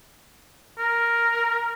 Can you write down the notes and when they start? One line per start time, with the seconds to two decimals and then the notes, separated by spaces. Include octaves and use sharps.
0.79 A#4